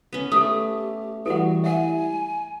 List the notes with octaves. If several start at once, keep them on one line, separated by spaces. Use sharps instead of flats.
B3 C#4
A3 G4 A4 D#6
E3 G3 F#4 A4 F#5
E5 F#5 G#5